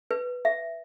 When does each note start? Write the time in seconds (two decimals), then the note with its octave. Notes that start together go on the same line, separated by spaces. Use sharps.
0.11 B4
0.45 E5